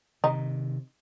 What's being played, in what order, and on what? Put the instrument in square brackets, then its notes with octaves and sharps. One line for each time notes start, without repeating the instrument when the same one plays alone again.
[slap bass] C3 D#3 [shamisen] D#4